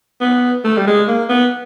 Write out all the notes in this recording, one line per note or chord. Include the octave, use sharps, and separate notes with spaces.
B3
A3
G3
G#3
A#3
B3